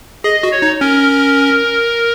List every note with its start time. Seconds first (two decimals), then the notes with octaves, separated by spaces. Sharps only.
0.24 G#4 D#5
0.43 F#4
0.52 C#5
0.62 D#4
0.81 C#4 A#4